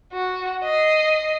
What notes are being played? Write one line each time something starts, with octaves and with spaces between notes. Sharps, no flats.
F#4
D#5 C7